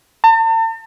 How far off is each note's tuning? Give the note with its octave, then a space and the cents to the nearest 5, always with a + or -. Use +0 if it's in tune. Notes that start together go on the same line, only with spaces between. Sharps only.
A5 +45